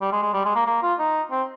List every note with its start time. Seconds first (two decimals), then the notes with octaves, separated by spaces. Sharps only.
0.01 G3
0.12 G#3
0.22 G#3
0.33 G3
0.45 G#3
0.55 A#3
0.66 A#3
0.82 F4
0.99 D#4
1.31 C4